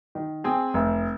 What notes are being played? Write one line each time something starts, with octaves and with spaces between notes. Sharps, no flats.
D#3
C4 G#4
F1